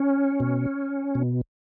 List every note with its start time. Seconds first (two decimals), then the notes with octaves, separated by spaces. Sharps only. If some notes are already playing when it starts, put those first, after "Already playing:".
Already playing: C#4
0.40 B2
1.15 B2